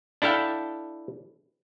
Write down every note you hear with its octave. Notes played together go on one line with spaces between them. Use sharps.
D4 E4 A4 F5 G5